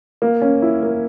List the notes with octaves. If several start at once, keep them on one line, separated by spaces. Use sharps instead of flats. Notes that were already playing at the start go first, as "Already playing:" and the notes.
A#3
C#4
E4
A#3